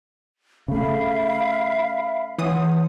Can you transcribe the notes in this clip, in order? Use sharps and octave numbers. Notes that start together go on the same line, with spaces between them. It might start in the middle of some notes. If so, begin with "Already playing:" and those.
C#3 A3 E5 F5 B5
E3 C#5 F#5 C6 D#6